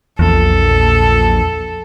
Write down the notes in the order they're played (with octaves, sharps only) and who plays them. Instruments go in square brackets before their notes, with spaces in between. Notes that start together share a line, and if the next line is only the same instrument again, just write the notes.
[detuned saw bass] A#1 [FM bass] E2 [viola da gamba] A4